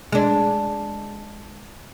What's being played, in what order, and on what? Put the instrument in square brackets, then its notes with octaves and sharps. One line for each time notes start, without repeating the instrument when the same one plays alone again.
[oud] G#3 D4